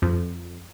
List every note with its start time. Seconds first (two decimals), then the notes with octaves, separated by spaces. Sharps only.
0.02 F2